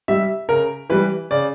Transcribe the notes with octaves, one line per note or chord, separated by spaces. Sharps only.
G3 E5
C#3 A#4
E3 G3 B4
C#3 D5